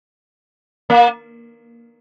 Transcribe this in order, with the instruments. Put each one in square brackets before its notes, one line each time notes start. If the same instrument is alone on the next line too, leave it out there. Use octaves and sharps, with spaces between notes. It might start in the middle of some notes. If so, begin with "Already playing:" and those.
[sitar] A#3